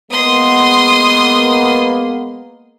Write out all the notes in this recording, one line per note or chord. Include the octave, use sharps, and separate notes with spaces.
G#3 A#3 B3 C6 D#6